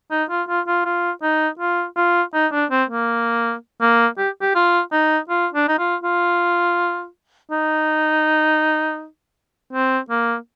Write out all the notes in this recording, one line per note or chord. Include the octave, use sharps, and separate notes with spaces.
D#4
F4
F4
F4
F4
D#4
F4
F4
D#4
D4
C4
A#3
A#3
G4
G4
F4
D#4
F4
D4
D#4
F4
F4
D#4
C4
A#3